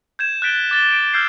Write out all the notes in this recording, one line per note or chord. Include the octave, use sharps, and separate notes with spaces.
G6 G#6 E7
F#6 G6 A6 B6 D7 G7
D6 A6 G7
D7
E6 F6 G6 G#6 C7